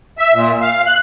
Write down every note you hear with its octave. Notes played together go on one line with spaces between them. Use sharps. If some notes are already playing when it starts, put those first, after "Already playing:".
E5
A#2
F5
F#6